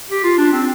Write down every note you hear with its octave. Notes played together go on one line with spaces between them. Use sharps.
G4
F4
D4
C4